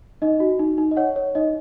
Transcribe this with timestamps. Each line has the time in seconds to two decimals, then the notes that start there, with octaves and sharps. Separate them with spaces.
0.22 D#4 D#5
0.40 F#4
0.59 D#4
0.78 D#4
0.91 D#5
0.97 C#5 F#5
1.16 C#5
1.35 D#4 D#5